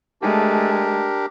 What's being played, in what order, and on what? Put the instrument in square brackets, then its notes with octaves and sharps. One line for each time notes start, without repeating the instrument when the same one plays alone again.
[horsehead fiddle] G#3 A3 [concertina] D4 G4 A#4